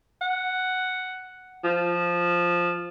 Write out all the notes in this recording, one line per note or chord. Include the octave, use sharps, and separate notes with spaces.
F#5
F3